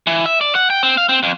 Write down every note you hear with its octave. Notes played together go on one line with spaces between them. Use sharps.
E3
E5
D5
F#5
G5
C4
F5
C4
F2